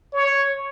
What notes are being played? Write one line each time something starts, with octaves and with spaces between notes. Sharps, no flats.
C#5